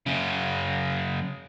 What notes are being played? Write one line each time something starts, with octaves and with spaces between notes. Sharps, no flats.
F#2 C#3